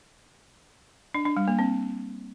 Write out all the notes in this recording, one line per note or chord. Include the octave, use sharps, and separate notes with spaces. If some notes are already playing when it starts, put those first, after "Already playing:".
D4
D4
G3
A#3
C4